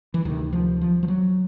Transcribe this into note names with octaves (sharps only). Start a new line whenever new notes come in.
E3
D2 C3 D#3
F3
F3
F3
F#3